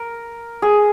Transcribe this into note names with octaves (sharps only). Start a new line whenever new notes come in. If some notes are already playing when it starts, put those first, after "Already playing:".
Already playing: A#4
G#4